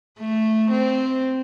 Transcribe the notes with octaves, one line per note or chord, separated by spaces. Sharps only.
A3
C4